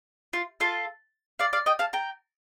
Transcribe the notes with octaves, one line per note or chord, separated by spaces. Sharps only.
F4
F4 A4
D5 F5
D5 F5
D#5 G5
F5 A5
G5 A#5